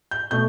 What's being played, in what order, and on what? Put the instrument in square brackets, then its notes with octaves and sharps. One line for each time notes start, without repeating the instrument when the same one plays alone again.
[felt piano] G6
B2 A3 G6